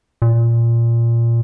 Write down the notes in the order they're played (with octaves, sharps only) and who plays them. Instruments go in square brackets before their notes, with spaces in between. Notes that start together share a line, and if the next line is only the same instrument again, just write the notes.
[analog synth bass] A#2